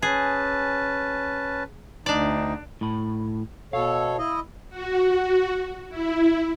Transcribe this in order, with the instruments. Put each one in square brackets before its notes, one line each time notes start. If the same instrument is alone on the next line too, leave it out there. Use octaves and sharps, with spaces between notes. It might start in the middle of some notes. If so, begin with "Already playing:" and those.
[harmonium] C#4 B4 A5 [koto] G#4
[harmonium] D2 D#4 [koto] D4 D5
[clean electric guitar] A2 B5
[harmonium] B2 A4 C#5 [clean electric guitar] F5
[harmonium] E4 D#5
[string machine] F#4
E4